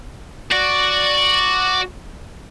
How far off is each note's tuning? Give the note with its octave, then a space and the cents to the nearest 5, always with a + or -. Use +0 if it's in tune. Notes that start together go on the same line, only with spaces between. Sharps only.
F#4 +0 D5 +0